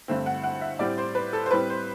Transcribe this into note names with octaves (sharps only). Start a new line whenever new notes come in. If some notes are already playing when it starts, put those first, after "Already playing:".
G2 D3 A3 C4
F#5
F#5
E5
A2 G3 C4 D5
C5
B4
A4
C5
A2 G3 C4 B4
C5